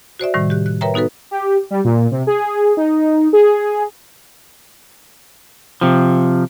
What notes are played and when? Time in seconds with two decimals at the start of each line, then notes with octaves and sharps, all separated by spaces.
0.20 F#4 C5 D5 E5
0.34 A2 C3 D#3 G3
0.50 G4 F#6
0.66 F#6
0.81 A#4 B4 C#5 E5 G5 A#5
0.94 B3 D#4 F#4 A4 B4
1.31 G4
1.71 G3
1.84 A#2
2.11 C3
2.27 G#4
2.77 D#4
3.33 G#4
5.81 C3 F3